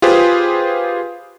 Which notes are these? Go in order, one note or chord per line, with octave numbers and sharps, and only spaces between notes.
F4 G4 G#4 B4 C5